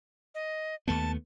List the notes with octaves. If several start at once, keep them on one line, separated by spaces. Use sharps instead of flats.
D#5
D#2 A3 B3 A5